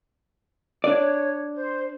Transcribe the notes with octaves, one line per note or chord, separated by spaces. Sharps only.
D4 C#5 D5
C5